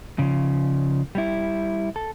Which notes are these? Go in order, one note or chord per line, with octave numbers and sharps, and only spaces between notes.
C#3 F3
G3 E4
A4